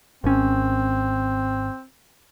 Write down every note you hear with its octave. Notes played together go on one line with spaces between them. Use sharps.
G#1 C4 C#4